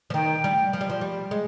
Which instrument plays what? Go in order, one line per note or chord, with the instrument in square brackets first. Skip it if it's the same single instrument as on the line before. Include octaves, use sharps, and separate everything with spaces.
[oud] F3
[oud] D#3 [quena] G5
[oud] G3
F3
G3
F3
G3
G#3